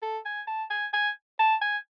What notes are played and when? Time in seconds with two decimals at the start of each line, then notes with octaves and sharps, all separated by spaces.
0.02 A4
0.25 G#5
0.47 A5
0.70 G#5
0.93 G#5
1.39 A5
1.61 G#5